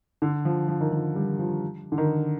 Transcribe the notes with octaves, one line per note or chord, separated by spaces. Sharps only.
D3
F3
F3
D#3
F3
G3
F3
D3
D#3